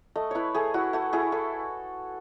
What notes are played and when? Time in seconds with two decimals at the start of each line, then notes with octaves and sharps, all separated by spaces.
0.15 A3 D#5
0.31 E4 B4 C#5
0.55 A3 G#4
0.74 E4 F#4
0.93 A3 F#4
1.13 E4 G#4
1.32 E4 A4